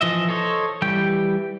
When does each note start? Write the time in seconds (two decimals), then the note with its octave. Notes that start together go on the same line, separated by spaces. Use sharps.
0.01 E3 F3 D#5 E5
0.29 A4 C5 C#5 D#5
0.82 E3 G3 G4 G5